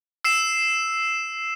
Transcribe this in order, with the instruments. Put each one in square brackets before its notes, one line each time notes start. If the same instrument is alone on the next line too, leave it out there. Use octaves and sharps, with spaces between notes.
[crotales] E6 C7 E7